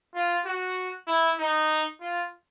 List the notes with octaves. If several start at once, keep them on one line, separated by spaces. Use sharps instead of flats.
F4
F#4
E4
D#4
F4